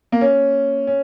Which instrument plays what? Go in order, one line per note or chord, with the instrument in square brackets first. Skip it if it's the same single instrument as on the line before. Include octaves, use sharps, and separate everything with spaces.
[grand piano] A#3
C#4
C#4